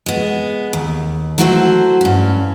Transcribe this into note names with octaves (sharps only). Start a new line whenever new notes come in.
G#3 B3
D#2
F#3 A3 E4 F#4 A#4 C5
G2 C#4